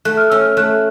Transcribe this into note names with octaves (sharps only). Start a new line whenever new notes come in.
A3 F#6
F6
C#4 E6
F6
A3 F#6